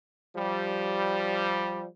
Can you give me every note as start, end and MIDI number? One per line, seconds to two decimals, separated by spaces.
0.36 1.86 53
0.36 1.86 55